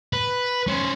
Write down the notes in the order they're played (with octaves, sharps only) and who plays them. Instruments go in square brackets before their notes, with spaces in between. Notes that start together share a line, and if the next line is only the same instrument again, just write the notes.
[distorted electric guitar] B4
C#4 C5